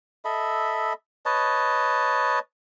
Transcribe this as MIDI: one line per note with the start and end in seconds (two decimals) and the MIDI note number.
0.25 0.93 69
0.25 0.93 75
0.25 0.93 76
0.25 0.93 83
1.26 2.39 71
1.26 2.39 73
1.26 2.39 75
1.26 2.39 81